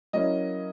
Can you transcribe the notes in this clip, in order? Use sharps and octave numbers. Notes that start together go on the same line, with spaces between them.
F#3 A#3 C#4 E4 D#5